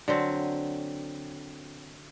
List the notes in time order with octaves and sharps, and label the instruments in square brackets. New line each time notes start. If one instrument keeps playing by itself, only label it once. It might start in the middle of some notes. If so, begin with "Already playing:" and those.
[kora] D3 F#3 C4